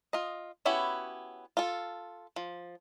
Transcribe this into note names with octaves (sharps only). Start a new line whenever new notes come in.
F4 D#5
B3 C#4 E4 F#4 G4
F4 A4
F3